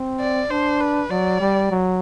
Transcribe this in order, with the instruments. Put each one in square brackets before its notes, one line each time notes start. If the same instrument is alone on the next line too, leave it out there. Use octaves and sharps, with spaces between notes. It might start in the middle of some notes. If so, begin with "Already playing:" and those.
Already playing: [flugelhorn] C4
[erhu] D5
[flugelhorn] D4 [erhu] C5
[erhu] B4
[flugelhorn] F#3 [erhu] D5
[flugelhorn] G3
F#3